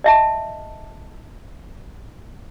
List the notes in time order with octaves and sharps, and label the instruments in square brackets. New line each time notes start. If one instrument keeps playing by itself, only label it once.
[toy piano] D#5 E5 A5